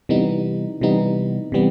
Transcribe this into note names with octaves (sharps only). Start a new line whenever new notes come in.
C3 E3 G3 B3 D#4
C3 E3 G3 B3 D#4
C3 E3 G3 B3